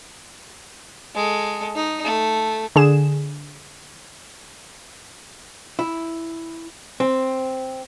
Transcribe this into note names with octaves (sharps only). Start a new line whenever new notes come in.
G#3 A4
D#4
A3
D3 G#4 E7
E4
C4